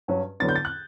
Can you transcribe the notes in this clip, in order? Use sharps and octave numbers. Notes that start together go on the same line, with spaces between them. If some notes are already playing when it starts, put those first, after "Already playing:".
G2 F#3 C#4
E2 D3 F#3 B3 D4 A6
G6
A6
F#6